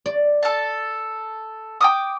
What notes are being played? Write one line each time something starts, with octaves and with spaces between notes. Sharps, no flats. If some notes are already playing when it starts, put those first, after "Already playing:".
D5
A4 A5
G5 D6 D#6